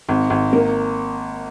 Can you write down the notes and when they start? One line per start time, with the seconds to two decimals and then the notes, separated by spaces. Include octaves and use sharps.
0.09 G#1
0.30 G#1
0.53 A#3